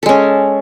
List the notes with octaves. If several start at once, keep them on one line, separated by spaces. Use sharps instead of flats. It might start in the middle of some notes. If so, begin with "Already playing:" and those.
G#3 C#4 A4